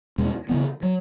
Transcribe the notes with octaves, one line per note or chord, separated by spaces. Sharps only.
E2 B2 G#3 C#4
C#3 E3 B3
F#3